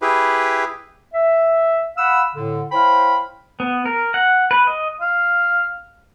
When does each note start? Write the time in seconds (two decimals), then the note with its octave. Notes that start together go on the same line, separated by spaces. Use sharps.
0.02 E4 G4 G#4 B4
1.13 E5
1.97 F5 F#5 B5 E6
2.35 A2 D3
2.72 E4 C5 C#5 F5 G5 B5
3.60 B3
3.86 A#4
4.14 F#5
4.51 B4
4.67 D#5
5.01 F5